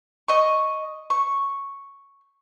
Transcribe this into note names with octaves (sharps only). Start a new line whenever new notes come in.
D#5 C#6
C#6